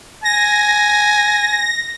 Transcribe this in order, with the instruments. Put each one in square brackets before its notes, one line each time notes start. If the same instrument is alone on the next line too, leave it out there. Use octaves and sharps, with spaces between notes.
[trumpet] G#5 [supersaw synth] A#6